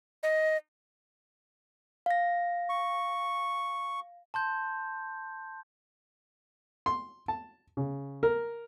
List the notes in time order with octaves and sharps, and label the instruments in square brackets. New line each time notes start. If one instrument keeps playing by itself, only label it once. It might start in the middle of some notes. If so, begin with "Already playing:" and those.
[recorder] D#5
[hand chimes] F5 A#6
[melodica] C#6
[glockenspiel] A5 C6 G6
[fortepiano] C6
A5
C#3
A#4